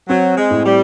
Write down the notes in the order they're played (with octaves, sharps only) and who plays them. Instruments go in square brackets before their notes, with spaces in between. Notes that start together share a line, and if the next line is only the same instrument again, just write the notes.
[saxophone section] F#3 [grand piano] C4
[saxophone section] G#3
[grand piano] A2
[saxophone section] G3